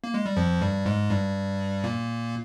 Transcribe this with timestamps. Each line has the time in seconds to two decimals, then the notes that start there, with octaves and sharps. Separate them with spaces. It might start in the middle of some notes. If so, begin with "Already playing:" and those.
0.04 A#3
0.14 G#3
0.26 G3
0.36 F2 F3
0.61 G2 G3
0.86 G#2 G#3
1.10 G2 G3
1.84 A#2 A#3